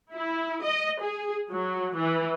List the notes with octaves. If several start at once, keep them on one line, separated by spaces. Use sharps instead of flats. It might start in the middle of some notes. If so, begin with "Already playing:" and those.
E4
D#5
G#4
F#3
E3